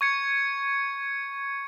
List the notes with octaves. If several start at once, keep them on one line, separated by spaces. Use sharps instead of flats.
C#6 G#6 C#7